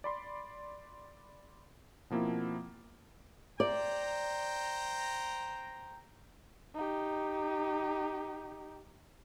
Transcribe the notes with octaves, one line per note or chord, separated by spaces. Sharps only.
D5 B5 C6
B2 F3 A#3 C4 E4
C5 D5 G5 A#5
D#4 G4